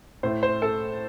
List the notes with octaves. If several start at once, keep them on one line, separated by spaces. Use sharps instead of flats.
A2 A3 C5
C5
A4